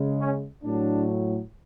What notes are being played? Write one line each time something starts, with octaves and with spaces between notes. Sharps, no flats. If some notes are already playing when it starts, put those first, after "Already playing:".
Already playing: C#3 G#3
C#4
A2 F#3 D4